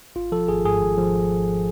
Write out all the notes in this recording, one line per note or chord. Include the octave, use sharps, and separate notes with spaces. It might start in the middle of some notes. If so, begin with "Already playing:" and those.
G#1 F4
F3 A4
G#1 G#4
G#2 G#4
G#1
F3